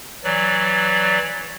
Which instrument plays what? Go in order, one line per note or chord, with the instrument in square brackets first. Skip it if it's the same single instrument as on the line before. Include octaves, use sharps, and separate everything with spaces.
[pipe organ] E3 F#3 D5